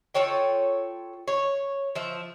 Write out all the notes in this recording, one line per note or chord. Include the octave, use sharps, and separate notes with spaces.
F4 A4 C#5 G5
C#5
F3 E5